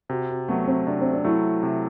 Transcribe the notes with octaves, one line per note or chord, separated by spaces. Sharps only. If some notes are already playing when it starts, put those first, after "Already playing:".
C3 F#4
F#4
F#3 A3 B3
C4
C3 D4
C4
D4
F#3 A3 E4
C3